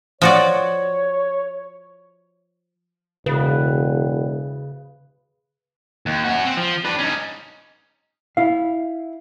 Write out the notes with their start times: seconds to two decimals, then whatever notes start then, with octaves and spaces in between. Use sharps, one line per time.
0.22 F3 F#4 C#5 D5
3.26 E1 C#3 B4
6.06 D#2
6.24 C#4 F#4
6.45 C4
6.57 F3
6.85 D4 B4
6.98 C#4 D#4
8.37 E4 F5